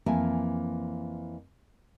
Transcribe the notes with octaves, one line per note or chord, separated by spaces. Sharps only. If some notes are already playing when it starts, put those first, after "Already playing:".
F2 E3 A#3 E5 G#5 A5